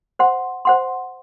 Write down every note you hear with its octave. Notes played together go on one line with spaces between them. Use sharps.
C5 F#5 C6
C5 F#5 C6